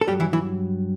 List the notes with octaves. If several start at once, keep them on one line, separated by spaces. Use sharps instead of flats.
A4
G2 F#3 G3 G4
E3 E4
E3 E4